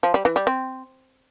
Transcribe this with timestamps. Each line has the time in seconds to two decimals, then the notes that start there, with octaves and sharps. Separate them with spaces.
0.03 F3
0.14 G3
0.25 E3
0.36 G3
0.47 C4